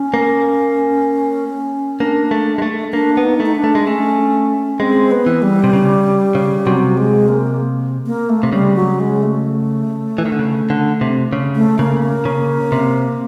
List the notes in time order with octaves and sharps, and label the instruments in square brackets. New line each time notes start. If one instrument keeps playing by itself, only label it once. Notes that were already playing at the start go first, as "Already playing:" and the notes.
Already playing: [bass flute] C#4
[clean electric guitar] A#3
[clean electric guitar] A#3 [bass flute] D4
[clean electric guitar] A3
G#3
A3
[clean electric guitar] A#3 [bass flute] D4
[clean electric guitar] B3
[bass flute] D#4
[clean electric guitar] A3
[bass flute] D#4
D4
[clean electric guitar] A3
G#3
[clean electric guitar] A3 [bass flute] C#4
[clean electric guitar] G#3 [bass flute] C4
[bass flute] B3
[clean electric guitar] E3
[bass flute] G3
[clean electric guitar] C3
C#3
C#3
[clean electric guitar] C3 [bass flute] F#3
[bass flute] G#3
A#3
A#3
A3
[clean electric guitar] C3
[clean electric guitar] C#3 [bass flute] G3
[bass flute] F#3
G#3
A3
[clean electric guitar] E3
D#3
D3
C#3
D3
C3
C#3
[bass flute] A3
[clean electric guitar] C#3 [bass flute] A#3
[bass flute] A#3
[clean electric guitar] C#3
C3